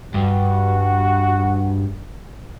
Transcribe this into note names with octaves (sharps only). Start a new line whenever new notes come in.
G2 F#4